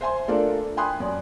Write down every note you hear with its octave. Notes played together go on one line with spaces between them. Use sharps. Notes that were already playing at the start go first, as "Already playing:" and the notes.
C5 E5 G#5 C6
A3 D4 F4 A4 A#4 D5
G5 G#5 B5 C6 D#6 F#6
F#2 D5 G#5